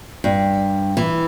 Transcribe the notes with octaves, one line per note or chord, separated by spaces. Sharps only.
G2
E3